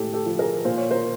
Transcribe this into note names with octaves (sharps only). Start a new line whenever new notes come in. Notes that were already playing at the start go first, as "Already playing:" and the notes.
Already playing: A2 G#3 G4 A4
G4 A4
F3
G#4 A#4
A#2 C5
C#5
A#4 C5